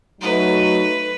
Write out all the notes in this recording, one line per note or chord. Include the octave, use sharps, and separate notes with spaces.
F#3 A3 D#4 B4